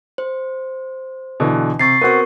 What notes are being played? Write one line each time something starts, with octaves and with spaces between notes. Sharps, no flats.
C5
B2 D3 E3
C3 C#6 A6 C7
B3 C4 F#4 A#4 C#6